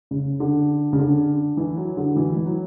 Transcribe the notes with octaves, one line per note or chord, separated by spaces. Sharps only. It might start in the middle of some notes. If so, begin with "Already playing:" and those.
C#3
D3
C#3
D3
E3
F#3
D3
E3
E3
F#3